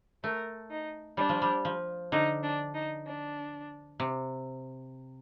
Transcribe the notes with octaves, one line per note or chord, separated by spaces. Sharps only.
A3 A#4
D#4
G3 D4
F3
G3
F3
D3 D#4
D4
D#4
D4
C3